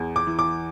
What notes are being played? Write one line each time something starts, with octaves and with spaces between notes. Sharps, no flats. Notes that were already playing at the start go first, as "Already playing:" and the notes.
Already playing: E2
D6
E3
D6